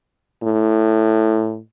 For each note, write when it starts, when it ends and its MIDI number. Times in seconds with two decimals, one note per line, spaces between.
0.43 1.59 45